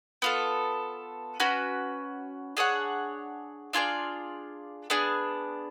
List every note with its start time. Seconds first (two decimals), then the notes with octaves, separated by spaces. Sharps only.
0.22 B3 F4 A4
1.40 C#4 F#4 B4
2.57 D4 G#4 C#5 F#5
3.73 D4 F4 G#4 D5
4.90 B3 D4 G#4